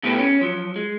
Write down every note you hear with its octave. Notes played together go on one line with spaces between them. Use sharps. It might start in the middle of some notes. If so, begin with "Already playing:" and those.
B2 A3 E4 G4 B4
C#4
F3 F#3
G#3